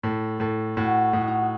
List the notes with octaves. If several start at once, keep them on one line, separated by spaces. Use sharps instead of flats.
A2 A4
A2 A4
A2 F#4
A2 D#4
F#4
D#4
F#4